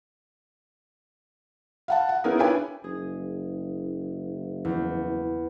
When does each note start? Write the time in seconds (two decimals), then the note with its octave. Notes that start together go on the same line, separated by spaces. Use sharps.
1.88 F5 F#5 A5
2.09 F#5
2.24 B3 C#4 D#4 E4 G#4 A#4
2.39 D4 E4 B4 C#5 G5 G#5
2.84 F#1 G#4
4.65 E2